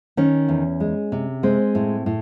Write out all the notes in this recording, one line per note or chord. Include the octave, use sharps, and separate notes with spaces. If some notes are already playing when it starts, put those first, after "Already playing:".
D#3 C#4
E2
G#3
C3
G#3 C4
A2
A2